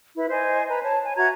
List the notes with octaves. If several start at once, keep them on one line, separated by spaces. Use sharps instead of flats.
E4 B4 E5
C5 D#5 G#5
B4 A#5
C#5 A5
G#5
F#4 E5 A#5 G#6